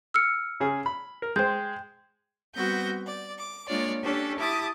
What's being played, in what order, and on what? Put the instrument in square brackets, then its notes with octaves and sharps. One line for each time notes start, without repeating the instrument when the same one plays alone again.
[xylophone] E6 F6 C#7
[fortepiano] C#3 G#4
B5
A#4
[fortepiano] G#3 C5 [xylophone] G5 G6
[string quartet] G3 B3 C4 F#4 G6 A#6
D5
D6
G#3 A#3 D4 F4 C#5 D5
C#4 D4 G4 A4
E4 G4 A5 D6 D#6